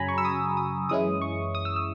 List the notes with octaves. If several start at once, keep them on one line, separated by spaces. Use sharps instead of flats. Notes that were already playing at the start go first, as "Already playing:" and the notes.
Already playing: F#2 C#3 F#3 G#5 A#5 B5
C#6
E6
D#6
D#6
F#2 E3 G#3 C#4 E4 D#6
C#6
D#6
E6
E6